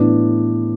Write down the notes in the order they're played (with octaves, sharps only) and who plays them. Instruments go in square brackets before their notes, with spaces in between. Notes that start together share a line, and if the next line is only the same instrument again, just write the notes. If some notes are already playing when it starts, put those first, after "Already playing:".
Already playing: [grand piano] A2 E3 B3 D4